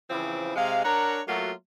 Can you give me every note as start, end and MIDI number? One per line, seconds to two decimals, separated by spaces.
0.10 0.54 49
0.10 0.54 52
0.10 0.54 53
0.10 0.54 60
0.10 0.54 64
0.56 0.85 48
0.56 0.85 56
0.56 0.85 77
0.85 1.21 62
0.85 1.21 70
0.85 1.21 73
0.85 1.21 78
0.85 1.21 82
1.28 1.52 54
1.28 1.52 57
1.28 1.52 58
1.28 1.52 65
1.28 1.52 66